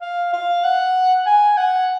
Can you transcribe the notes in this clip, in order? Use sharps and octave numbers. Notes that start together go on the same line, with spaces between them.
F5
F5
F#5
G#5
F#5